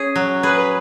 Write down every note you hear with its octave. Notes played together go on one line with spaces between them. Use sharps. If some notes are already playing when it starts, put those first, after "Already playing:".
Already playing: C#4 G#4
F#3
G#4 B4